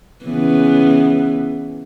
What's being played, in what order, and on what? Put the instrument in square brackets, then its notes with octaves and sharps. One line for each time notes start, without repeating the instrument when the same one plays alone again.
[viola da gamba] C#3 E3 B3